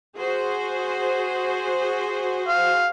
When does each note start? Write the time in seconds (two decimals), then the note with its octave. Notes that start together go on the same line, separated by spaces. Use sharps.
0.17 F#4 G#4 C5
2.48 F5